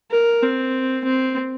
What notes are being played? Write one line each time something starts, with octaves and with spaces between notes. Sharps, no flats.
A#4
C4
C4